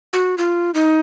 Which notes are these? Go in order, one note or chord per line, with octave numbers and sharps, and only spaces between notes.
F#4
F4
D#4